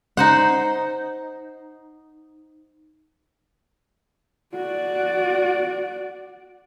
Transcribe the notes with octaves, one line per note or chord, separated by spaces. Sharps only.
D#4 C5 F#5
F#4 D5